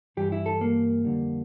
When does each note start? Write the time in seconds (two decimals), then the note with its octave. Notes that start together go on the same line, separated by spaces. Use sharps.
0.17 G2 E3 G3 G4
0.32 E4
0.46 A4
0.61 A#3
1.05 F2 D3 G3